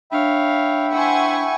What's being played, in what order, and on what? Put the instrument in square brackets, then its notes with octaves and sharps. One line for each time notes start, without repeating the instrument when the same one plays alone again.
[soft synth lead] D4 [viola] C#5 F5 [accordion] E5 G5 B5
[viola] E4 C5 [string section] F#5 G#5 C#6